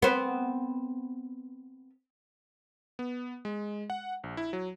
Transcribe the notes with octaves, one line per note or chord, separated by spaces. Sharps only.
B3 C4
B3
G#3
F#5
A#1
E4
F#3